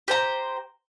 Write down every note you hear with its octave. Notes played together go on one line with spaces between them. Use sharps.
G4 C5 A#5